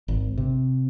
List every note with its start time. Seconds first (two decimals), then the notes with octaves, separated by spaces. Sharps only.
0.08 G#1
0.37 C3